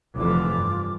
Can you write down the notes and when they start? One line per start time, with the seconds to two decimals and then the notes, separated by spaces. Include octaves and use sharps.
0.15 F1 D3 E3 F4 D6
0.52 G2